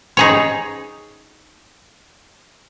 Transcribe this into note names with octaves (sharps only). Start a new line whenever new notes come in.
D#4 G#4 C#5